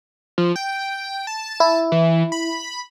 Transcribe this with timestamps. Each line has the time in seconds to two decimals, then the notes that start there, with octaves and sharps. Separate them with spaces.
0.38 F3
0.56 G5
1.27 A5
1.60 E4
1.92 E3
2.32 B5